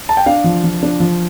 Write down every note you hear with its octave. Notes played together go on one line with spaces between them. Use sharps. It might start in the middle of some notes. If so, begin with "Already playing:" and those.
A5
G5
D4 F5
F3
F3
D4
F3